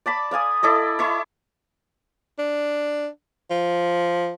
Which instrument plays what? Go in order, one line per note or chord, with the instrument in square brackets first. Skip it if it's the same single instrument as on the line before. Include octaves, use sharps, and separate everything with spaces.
[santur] D5 A5 B5 D6
D5 F5 G#5 D#6
E4 A4 D5 D#5
E4 E5 C#6 D6
[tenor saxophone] D4
F3